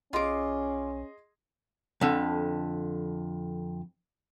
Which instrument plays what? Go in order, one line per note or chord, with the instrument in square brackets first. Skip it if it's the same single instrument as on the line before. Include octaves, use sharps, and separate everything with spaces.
[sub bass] B1 [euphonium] C#4 [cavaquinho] F4 D6 [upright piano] G#4 D#5 C6
[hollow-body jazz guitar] F2 D3